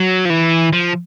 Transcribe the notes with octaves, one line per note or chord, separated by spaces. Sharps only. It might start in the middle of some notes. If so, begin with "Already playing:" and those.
Already playing: F#3
F3
E3
F3